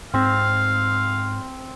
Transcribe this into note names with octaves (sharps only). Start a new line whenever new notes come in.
G#2 C4 F5